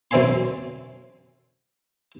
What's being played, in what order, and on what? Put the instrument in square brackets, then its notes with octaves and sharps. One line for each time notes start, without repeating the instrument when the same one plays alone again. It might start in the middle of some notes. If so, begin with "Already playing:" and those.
[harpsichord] F#2 D3 C4 E5 G#5 C6